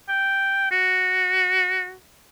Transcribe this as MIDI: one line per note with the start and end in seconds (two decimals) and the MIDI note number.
0.09 0.67 79
0.71 1.94 66